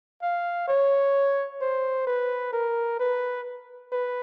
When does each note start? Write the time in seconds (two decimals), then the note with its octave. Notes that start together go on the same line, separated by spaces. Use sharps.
0.22 F5
0.68 C#5
1.61 C5
2.07 B4
2.53 A#4
3.00 B4
3.92 B4